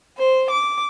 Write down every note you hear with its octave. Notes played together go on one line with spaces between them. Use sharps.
C5
D6